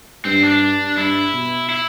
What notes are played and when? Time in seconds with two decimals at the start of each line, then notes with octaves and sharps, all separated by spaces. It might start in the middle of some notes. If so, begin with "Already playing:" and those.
0.25 G2 C4
0.44 D4
0.97 G2 E4
1.33 B2
1.69 E4